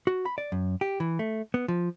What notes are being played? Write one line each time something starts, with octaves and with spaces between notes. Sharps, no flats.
F#4
B5
D5
F#2
G4
E3
A3
B3
F3